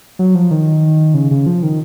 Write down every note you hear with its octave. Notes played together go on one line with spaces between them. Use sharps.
F#3
F3
D#3
C#3
C#3
F3
D#3